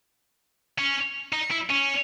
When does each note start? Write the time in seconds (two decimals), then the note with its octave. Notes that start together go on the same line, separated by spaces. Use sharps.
0.78 C#4
1.33 D#4
1.51 E4
1.70 C#4